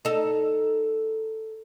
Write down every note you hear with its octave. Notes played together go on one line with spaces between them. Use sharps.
D#4 A4